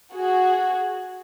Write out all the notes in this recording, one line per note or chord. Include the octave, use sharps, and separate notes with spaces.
F#4 G#4